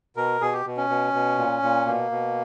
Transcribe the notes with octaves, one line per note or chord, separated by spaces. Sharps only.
B2 A#4
B2 G#4
G4
B2
C#4
B2
B2
A#2
A#2
B2 A#3
B2